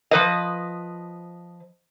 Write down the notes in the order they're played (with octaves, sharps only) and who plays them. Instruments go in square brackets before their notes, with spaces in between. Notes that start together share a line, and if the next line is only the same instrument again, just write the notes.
[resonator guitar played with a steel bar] F3 B4 D#5